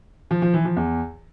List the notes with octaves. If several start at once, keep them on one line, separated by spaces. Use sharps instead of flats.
F3
F3
E3
F3
E2